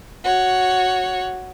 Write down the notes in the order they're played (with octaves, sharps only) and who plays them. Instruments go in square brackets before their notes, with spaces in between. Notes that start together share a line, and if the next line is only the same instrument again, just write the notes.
[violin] F#4 C#5